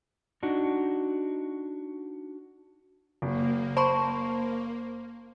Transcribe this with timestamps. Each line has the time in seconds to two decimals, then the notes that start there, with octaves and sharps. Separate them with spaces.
0.43 D4 D#4 F#4
3.22 F#1 A#3
3.77 C5 A5 B5 C#6